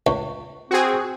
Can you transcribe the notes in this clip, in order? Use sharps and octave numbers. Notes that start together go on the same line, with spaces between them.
C#2
C4 F#4 G#4